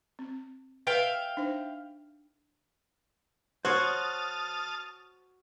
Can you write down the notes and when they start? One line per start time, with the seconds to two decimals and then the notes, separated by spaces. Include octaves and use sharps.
0.19 C4
0.87 B4 E5 F5 G5
1.37 D4 D#4 C5
3.65 F#4 C5 C#5 A5 D#6 F6